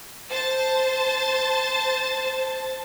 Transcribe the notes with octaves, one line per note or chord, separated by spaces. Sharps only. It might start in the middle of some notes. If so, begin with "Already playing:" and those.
C5 A5 A6